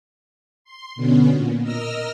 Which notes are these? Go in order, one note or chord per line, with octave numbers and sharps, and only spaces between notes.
C6
B2 D3 B3 C#4
A#2
A#4 D#5 E6 F6 A#6